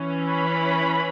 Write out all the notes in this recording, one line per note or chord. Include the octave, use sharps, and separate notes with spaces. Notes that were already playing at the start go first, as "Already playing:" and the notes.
Already playing: E3 C#4
B5